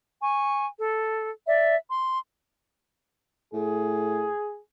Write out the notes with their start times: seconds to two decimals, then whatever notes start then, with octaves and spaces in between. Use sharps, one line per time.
0.22 G#5 C#6
0.78 A4
1.46 D5 E5
1.89 C6
3.53 A2 G#4